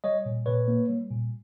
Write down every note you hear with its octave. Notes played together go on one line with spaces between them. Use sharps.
G3 C#5 D#5
A#2
A#2 B4 C#5
A#3
G3
A#2